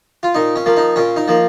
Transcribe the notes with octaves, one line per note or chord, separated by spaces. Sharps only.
F4
A#2 D#4
C#4
F3 A#3
D#4
A#2 C#4
D#4
F3 A#3